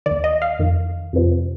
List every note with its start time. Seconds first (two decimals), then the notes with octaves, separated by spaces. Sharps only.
0.06 D#2 D#3 D5
0.24 D#5
0.42 F5
0.59 F2 D#3
1.13 F2 C3 F3